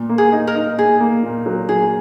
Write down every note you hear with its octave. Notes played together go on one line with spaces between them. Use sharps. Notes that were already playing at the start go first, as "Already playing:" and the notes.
Already playing: A#2
A#3
G#4
D#4
A#4
D#4
A#2 G#4
A#3
A#2
F#3
F#3 G#4